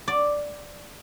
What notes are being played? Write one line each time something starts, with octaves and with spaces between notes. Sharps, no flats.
D5